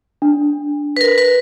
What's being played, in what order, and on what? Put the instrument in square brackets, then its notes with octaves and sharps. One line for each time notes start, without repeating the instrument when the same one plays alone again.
[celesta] D4
[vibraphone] A#4 B4
B4